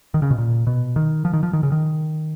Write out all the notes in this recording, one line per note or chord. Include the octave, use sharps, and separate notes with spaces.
D#3
C#3
B2
A#2
B2
D#3
F3
D#3
F3
D#3
C#3
D#3